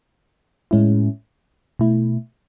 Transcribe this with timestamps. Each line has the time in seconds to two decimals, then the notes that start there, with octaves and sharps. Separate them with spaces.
0.71 A2 G#3 C#4 E4
1.79 B2 A3 E4